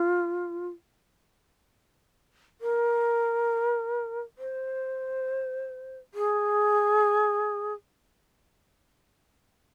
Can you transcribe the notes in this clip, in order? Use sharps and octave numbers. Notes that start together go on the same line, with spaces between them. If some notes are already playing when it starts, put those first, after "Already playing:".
Already playing: F4
A#4
C5
G#4